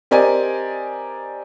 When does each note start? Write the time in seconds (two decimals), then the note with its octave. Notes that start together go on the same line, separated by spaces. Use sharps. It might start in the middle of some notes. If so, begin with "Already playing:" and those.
0.11 C4 G4 A#4 D5 D#5 G#5